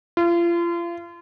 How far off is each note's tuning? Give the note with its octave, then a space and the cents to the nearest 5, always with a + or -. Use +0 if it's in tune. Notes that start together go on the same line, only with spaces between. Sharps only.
F4 -35